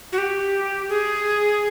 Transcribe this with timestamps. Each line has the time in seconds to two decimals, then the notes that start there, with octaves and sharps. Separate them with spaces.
0.12 F#4
0.18 G4
0.89 G#4